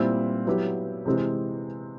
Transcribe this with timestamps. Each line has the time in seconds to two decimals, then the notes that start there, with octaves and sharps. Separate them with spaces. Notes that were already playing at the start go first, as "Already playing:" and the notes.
Already playing: A#2 G3 C4 E4
0.47 F#3 B3 E4 G4
1.05 C3 E3 G#3 C4